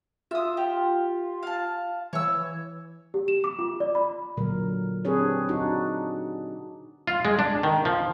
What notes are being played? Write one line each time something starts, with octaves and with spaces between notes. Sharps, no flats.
F4 E5 D#6
G4
F5 A5
E3 C#5 E6
G4
E7
D6
F4
D5
B5
A#2 D3 F#3 A#4
C4 D4 G4 G#4 B4 C#5
D4 D#4 F#4
F4
G#3
D4
D#3
F3